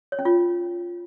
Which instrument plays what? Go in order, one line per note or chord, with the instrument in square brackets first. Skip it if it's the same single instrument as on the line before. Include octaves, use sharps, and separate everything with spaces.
[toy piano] C#5
C#4
F4